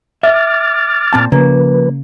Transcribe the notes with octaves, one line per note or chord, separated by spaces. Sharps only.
E5 D6 F6 A6
A#2 C4 A5
C#3 F3 A#3 B4